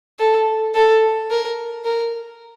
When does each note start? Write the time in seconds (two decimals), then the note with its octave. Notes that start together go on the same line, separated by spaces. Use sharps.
0.19 A4
0.75 A4
1.30 A#4
1.85 A#4